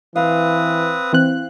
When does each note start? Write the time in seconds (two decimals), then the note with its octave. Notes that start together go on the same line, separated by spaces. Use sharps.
0.16 E3 C4 B4 F5 D#6
1.13 E3 C4 F#6